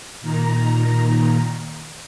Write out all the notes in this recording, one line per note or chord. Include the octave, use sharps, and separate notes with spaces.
A#2 D#3 A#5